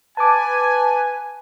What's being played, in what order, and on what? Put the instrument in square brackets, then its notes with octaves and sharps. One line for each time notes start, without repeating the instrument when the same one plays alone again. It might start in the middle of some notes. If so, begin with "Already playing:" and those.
[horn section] B4 G#5 [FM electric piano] A5 D6